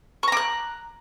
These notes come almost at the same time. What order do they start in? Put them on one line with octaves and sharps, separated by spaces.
C#6 A#5 D6 F#6